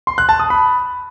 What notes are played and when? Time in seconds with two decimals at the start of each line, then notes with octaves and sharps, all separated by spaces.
0.07 C6
0.18 F#6
0.29 A5
0.40 D#6
0.50 B5